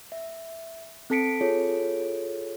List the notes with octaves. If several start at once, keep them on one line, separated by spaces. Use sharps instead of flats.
E5
C4 A4 A5 B6 C#7 D7
F4 G#4 A4 C#5